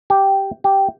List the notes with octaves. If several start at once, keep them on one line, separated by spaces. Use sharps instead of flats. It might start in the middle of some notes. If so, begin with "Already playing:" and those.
G4
G4